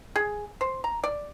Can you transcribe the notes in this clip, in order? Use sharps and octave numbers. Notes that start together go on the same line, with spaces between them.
G#4
C5
A#5
D5